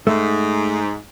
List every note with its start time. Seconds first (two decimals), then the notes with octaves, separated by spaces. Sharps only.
0.07 G#2 A3